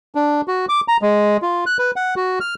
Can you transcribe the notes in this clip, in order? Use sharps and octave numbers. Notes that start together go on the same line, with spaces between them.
D4
F#4
D6
A#5
G#3
F4
F#6
B4
F#5
F#4
F6